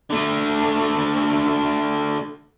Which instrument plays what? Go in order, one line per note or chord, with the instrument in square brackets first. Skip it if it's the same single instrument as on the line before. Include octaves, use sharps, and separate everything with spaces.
[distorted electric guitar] D3 A3